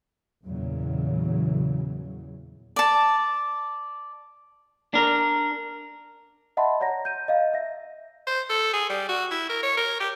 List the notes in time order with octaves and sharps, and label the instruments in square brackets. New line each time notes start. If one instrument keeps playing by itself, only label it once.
[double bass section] E2 A#2 C#3 E3 F#3
[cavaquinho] D5 A5
[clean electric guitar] D4 A#4
[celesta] D#5 E5 F#5 A5 B5 C6
C#5 D5 F#5 A#5 A#6
G6 D#7
D#5 F5
E5 A#6
[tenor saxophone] C5
A4
G#4
G3
F#4
E4
A#4
C#5
A#4
G4